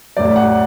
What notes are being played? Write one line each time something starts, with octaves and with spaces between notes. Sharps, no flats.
A1 A2 F#3 D5
F#5